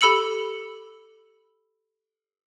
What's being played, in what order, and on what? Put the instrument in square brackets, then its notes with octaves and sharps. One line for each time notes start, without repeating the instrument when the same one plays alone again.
[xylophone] G4 A4 B5 E6 C#7 F#7